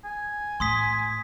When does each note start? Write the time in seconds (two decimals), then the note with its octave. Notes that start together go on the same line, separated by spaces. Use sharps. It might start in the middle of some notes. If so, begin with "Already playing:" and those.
0.04 G#5
0.60 A2 C6 D#6 B6